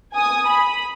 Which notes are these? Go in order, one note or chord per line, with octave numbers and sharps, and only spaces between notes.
G#5 D#6
B5